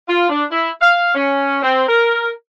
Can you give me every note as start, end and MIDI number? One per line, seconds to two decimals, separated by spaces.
0.08 0.28 65
0.29 0.43 62
0.51 0.69 64
0.81 1.14 77
1.15 1.60 61
1.62 1.84 60
1.87 2.30 70